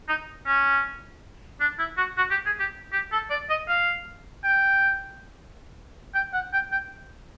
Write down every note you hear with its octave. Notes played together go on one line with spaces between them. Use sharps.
D#4
C#4
D4
E4
F#4
F#4
G4
G#4
G4
G4
A4
D5
D#5
F5
G5
G5
F#5
G5
G5